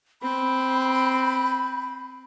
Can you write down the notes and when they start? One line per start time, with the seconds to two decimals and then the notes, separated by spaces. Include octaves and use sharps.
0.22 C4 B5